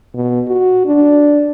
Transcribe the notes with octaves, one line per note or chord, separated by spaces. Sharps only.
B2
F#4
D4